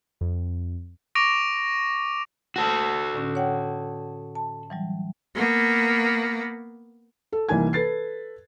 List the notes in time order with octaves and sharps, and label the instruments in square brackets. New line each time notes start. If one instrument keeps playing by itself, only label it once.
[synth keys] F2
[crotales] C#6 D6 A#6 D7 F7
[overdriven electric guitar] F#4 A4
[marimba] A2 D3 C#4
C#5 F#5 G5
A5
E3 F#3 G3
[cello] A#3 B3
[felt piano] A4
C2 E3 A#3 D#4 G#5 G#6
A4 B4 A6 C7